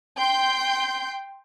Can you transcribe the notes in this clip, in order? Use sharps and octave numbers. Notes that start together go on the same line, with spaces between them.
G5 C6 G6